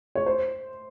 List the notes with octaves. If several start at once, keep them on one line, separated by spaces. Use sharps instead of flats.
C#5
C5